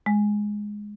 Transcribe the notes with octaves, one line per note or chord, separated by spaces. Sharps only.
G#3